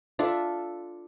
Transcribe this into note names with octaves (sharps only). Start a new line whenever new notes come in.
D4 F4 A4 E5